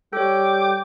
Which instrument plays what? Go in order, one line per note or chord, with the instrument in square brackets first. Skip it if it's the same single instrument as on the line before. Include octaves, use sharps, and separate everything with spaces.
[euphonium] G3 [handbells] A4 C#5 [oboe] G5 [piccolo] D6